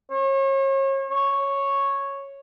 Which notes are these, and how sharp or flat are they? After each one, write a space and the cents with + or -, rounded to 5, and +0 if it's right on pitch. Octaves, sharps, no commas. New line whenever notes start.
C#5 -35
C#5 -5